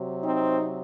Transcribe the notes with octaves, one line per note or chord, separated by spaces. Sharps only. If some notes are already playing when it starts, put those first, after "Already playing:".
Already playing: C3 F#3
C4 D#4